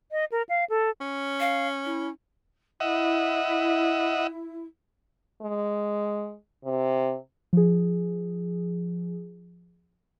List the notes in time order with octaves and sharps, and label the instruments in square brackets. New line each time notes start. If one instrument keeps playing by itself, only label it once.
[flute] D#5
A#4
F5
A4
[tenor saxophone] C#4
[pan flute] F5
E4
[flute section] E4 [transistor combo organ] D#5 E5 F#5
[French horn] G#3
C3
[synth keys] F3 G#4